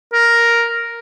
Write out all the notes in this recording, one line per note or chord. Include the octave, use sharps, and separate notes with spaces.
A#4